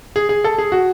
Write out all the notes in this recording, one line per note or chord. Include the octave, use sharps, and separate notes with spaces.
G#4
G#4
A4
G#4
F#4